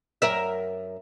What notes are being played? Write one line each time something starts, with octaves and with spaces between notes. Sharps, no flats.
F#2 A#4 E5